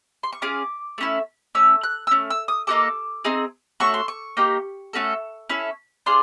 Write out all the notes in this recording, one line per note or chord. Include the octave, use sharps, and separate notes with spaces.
C6
C#6
C#4 F4 G#4 D6
A3 C#4 E4
A3 C#4 E6
F#6
E6
A3 C#4
E6
D#6
A#3 D#4 F#4 A4 D6
C4 D#4 G#4
A3 C#4 F#4 A4 C#6
C6
C#6
A#3 D#4 G4
A3 C#4 F#4 A4
C#4 E4 A4
D4 F4 G#4 C6